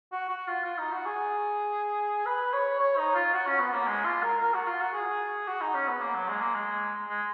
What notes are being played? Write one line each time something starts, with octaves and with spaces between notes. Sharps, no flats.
F#4
F#4
F4
F4
D#4
F#4
G#4
B4
C#5
C#5
D#4
F4
F#4
C#4
B3
A#3
G#3
F4
A#4
A#4
F#4
F4
F#4
G#4
F#4
D#4
C#4
B3
A#3
F#3
G#3
A#3
G#3
G#3